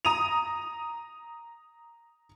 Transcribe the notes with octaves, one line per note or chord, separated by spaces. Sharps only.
A#5 D#6 D#7 F7